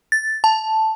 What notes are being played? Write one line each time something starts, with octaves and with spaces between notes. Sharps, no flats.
A6
A5